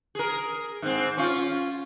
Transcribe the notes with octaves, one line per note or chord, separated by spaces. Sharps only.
G#4 A#4
G#2 C4
C#4 F4